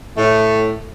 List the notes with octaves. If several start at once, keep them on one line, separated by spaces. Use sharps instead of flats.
A2 A3